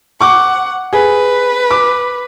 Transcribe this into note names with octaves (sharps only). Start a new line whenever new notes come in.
F#5 C#6 D6
G#4 B4
D6